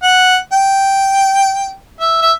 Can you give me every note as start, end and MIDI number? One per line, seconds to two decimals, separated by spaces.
0.03 0.37 78
0.53 1.77 79
2.00 2.20 76
2.21 2.32 76